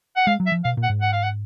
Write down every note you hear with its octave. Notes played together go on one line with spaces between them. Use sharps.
F#5
G#3 F5
F#3
E5
F3
B2 F5
A#2
F#5
G#2
F#5
F5
F#5